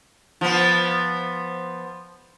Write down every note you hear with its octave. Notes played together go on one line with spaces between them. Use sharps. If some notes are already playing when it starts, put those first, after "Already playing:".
F3 B3